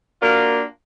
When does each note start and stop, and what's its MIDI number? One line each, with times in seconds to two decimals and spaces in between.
0.21 0.63 58
0.21 0.63 62
0.21 0.63 65
0.21 0.63 66
0.21 0.63 70